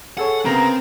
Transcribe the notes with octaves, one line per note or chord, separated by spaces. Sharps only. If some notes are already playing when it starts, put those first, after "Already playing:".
G#4 A4 C#5 F#5
C#3 B3 C4 A#4 A#5